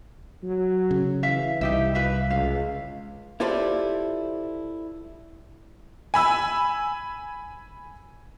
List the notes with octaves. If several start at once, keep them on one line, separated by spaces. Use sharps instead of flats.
F#3
C#3
E3 E5 F5
C2 D#4 G4 E5
B4 E5 F5
C#2 F5
E4 F4 G4 A4 C5 D5
G#5 B5 E6